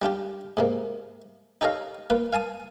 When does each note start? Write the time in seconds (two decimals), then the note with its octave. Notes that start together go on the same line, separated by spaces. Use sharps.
0.02 G3 D4 F4 G4
0.57 G#2 C3 A#3
1.61 D#4 G4 A4 C#5 D#5 F5
2.10 A#3 F4 B4
2.33 F5 G#5 A5 D#6